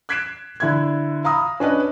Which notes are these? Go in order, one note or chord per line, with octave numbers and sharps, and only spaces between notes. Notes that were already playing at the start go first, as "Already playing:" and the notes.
F#6 G#6 B6 C7 D7 E7
D3 E4 F#6 G#6
F5 A#5 B5 D#6 E6
C#4 D4 B4 D#5